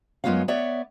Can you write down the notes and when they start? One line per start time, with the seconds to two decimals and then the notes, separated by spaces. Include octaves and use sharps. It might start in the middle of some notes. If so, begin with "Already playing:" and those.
0.24 F#2 G#3 B3 F4 C#5 F5
0.48 B3 C#5 D5 E5